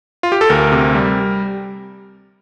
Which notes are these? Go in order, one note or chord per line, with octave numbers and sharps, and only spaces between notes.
F4
G4
A4
D2 A#4
C3
G3